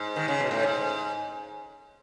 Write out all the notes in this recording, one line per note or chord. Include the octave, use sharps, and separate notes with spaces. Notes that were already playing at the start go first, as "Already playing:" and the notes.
Already playing: G#2
D#3
C#3
B2
A2
G#2